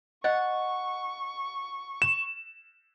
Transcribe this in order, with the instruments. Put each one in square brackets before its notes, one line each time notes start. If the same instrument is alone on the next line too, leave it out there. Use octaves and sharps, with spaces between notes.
[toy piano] D#5 [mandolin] F#5 [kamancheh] C#6
[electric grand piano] E7